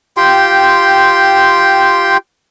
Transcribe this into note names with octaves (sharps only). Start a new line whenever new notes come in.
F4 G4 G5 C6